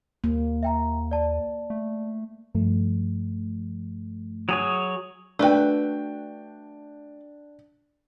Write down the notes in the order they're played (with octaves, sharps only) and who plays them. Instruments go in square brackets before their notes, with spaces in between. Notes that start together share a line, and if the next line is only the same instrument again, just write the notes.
[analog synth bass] D#2 [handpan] A#3
[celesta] E5 G5 A#5
D5 A5
[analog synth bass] A3
[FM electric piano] G2 F3 A3
[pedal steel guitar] F#3 G#4 C#5
[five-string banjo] A3 F#4 B4 [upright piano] D4 G5